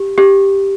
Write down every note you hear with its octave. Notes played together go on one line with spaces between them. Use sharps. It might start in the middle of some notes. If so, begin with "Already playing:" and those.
Already playing: G4
G4